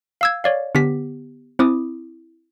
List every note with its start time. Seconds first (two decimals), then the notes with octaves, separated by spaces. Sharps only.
0.21 F5 E6 G#6
0.44 C#5 D5 F5
0.75 D3 B3 G4 B6
1.59 C4 E4 D6 D#6